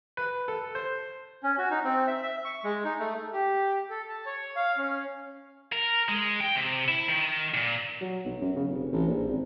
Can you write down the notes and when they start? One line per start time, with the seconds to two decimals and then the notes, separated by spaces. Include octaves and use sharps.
0.17 B4
0.48 A4
0.75 C5
1.43 C#4
1.58 F#4
1.71 D#4
1.84 C4
2.07 E5
2.23 E5
2.45 C#6
2.64 G#3
2.84 D#4
3.00 A3
3.33 G4
3.90 A4
4.09 A5
4.26 C#5
4.56 F5
4.77 C#4
5.72 A#4
6.09 G#3
6.41 G5
6.56 C3
6.88 E4
7.08 D#3
7.54 A#2
8.01 F#3
8.25 B1
8.41 F#2
8.56 C#3
8.68 F1
8.92 A1
9.07 A#1
9.28 G#1